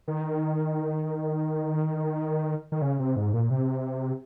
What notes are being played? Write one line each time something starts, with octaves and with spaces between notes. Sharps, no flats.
D#3
D#3
C#3
C3
G#2
A#2
C3